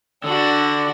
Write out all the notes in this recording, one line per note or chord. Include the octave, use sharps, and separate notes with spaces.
D3 D4 F#4